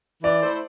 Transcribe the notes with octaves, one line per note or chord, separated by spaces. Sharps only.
E3 D5
A3 E4 A4 C5